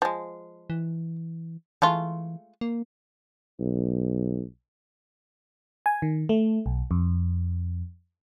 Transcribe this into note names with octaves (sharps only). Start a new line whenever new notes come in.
F3 G#3
E3
E3 G#3 A3 F4
A#3
B1
G#5
D#3
A3
B1
F2